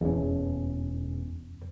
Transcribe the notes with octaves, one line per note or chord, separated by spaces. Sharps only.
E1 E2 C#4